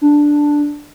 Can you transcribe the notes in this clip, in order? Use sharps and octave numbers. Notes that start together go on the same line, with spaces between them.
D4